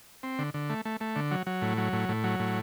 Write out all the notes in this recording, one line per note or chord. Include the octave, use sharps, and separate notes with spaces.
C4
D3
D3
A3
A3
A3
D3
F#3
F#3
A2
F#3
A2
A2
F#3
A2